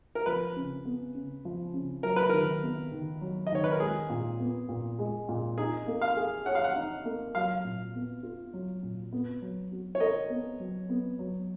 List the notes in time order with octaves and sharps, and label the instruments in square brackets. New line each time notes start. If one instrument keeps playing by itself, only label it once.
[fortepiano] A#4
[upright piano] F3 [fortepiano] B4
[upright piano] C#3
B3
C#3
F3
C#3
[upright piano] F#3 [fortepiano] A#4
[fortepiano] B4
[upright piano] D#3 [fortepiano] A#4
[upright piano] B3
D#3
F#3
[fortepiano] D#5
[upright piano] D#3 [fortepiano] C#5
[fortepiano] B4
A#4
[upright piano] G#3 [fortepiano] G#4
[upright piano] A#2
B3
A#2
G#3
A#2
[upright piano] D#4 [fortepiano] G#4
[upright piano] A#3
[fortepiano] F5
[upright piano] G#4
[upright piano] C#5 [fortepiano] F#5
[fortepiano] F5
F#5
[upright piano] D#4
A#3
[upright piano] F#3 [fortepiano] F5
[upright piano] A#2
B3
F4
F#3
A#2
B3
F#3
F#4
[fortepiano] C#5
[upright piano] A#4 [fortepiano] D#5
[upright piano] B3
F#3
B3
F#3